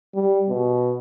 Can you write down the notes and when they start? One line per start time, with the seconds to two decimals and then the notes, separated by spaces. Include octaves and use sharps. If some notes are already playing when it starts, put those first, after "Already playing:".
0.14 G3
0.49 B2